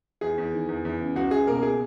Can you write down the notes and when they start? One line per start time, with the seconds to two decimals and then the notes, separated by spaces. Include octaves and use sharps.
0.21 E2 G#4
0.38 E2
0.53 D#3
0.69 E2
0.85 E2
1.01 C#3
1.16 C#2 F#4
1.31 C#2 G#4
1.47 B2 A#3 A#4
1.63 G#4